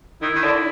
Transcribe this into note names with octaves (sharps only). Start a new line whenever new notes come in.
D#3 E4
D#3
D3